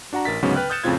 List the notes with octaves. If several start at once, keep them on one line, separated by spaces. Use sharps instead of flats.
D4 F#4 F#5 A#5
A1 A#4 A6 B6
D2 G#2 C#3 F#3 B3 C#4
B4 G5 F6 F#6
D#6 F#6 G6 A6 C#7 E7
F2 A2 C#3 C4 F4 G#6